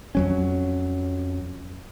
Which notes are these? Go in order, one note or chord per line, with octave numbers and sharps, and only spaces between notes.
F2 F#3 C#4